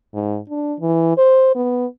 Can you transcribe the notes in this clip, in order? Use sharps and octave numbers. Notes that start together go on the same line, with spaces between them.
G#2
D4
E3
C5
B3